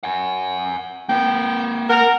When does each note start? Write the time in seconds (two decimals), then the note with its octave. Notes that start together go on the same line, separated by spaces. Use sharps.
0.03 F#5 G#5
1.09 A#3 B4 G5
1.90 A#4 F#5